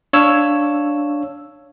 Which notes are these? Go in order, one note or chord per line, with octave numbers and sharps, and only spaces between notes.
D4 C#5 F5 E6